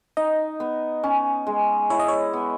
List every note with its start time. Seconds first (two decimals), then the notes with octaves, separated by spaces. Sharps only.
0.17 D#4 D#5
0.60 B3
1.03 C#4
1.47 G#3
1.90 E4 C#5
1.99 D#5
2.08 C#5
2.33 B3